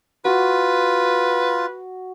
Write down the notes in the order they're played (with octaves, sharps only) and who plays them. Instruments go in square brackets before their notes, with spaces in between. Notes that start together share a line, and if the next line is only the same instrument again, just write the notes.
[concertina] F4 [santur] F#4 [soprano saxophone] B4